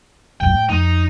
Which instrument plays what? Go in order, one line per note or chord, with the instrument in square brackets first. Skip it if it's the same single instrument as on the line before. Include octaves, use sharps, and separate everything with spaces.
[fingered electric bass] D#1 B1 F#2 [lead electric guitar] G5
[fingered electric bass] A2
[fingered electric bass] F2 [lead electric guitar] D#4